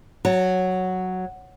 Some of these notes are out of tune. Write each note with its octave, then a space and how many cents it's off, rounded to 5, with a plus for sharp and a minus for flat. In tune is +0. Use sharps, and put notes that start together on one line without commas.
F#3 +0 A5 +40